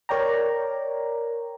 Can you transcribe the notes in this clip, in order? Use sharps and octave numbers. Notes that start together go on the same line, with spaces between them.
A#4 C#5 D5 G5 A#5